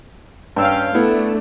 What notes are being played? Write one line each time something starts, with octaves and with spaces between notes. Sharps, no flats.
G2 C#4 F5 G5 E6
A3 B3 D4 E4